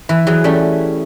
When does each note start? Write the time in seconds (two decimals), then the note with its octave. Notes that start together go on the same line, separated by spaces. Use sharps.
0.09 E3 E4
0.27 E3 F#3 G#4
0.44 G3 A3 C#4